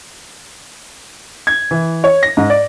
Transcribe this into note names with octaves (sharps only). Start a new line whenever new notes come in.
G#6
E3
C#5
A#6
G#2
D5